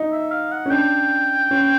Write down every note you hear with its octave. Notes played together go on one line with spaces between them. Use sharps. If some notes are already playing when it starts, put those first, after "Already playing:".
Already playing: D#4
E5
F5
F#5
C#4
D4 G5
C#4